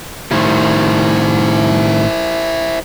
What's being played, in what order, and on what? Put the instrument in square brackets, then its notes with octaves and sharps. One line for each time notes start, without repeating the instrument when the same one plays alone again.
[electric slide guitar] A2 D#3 G3 [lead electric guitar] E4 C5